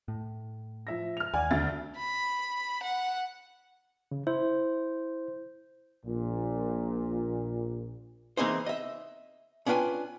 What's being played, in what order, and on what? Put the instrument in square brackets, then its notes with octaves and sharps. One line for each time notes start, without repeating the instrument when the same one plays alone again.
[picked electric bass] A2
[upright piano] F3 E5 A#6
F6 F7
[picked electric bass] D#2 [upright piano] D5 F#5 [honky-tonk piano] G#5
[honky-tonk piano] D2 E5 A6
[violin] B5
F#5
[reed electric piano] C#3
[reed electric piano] E4 [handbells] C5
[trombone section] A#1 A#2
[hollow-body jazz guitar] E3 A#3 C4 D#4 G#4 C5
D#5 E5
C#4 D4 F4 B4 G5 G#5